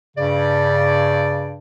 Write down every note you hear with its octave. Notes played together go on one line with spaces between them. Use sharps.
G2 C#3 D5